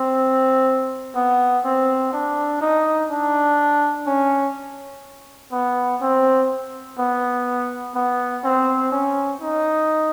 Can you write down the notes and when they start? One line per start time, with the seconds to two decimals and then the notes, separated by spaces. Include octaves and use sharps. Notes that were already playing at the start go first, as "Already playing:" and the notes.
Already playing: C4
1.15 B3
1.64 C4
2.13 D4
2.61 D#4
3.10 D4
4.07 C#4
5.52 B3
6.01 C4
6.99 B3
7.95 B3
8.44 C4
8.92 C#4
9.41 D#4